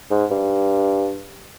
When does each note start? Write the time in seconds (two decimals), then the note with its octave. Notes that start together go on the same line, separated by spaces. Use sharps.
0.11 G#2
0.31 G2